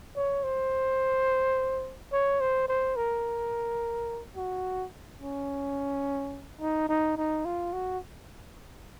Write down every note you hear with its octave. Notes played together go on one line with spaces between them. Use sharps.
C#5
C5
C#5
C5
C5
A#4
F#4
C#4
D#4
D#4
D#4
F4
F#4